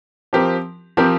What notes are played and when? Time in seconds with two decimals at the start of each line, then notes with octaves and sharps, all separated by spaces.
0.33 F3 C4 G4 A#4
0.97 F3 C4 G4 A#4